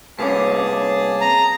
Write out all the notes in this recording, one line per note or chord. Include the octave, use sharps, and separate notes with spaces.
C2 A#3 C#4 G#4 B4 F5 A5 D6
A#5